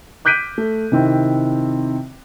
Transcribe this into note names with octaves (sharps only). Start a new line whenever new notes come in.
D6 F#6 G6 B6 D7 D#7
A3
C3 D#3 C4 E4